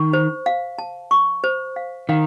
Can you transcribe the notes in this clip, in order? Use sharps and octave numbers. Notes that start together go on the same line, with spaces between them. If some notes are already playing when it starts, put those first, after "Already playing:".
Already playing: D#3 C#6
C5
F5
A5
C#6
C5
F5
D#3 F5